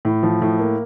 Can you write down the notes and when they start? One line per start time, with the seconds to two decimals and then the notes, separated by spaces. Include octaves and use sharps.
0.05 A2
0.23 F3
0.42 A2
0.59 A#3